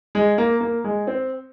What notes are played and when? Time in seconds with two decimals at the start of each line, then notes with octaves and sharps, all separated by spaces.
0.15 G#3
0.38 A#3
0.61 A#3
0.84 G#3
1.07 C4